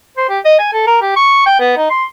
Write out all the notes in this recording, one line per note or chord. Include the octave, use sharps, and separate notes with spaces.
C5
G4
D#5
G#5
A4
A#4
G4
C#6
G5
B3
D#4
C6